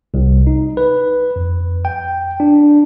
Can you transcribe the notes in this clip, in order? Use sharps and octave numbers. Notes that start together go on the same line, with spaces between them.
C2
D#4
B4
F2
G5
D4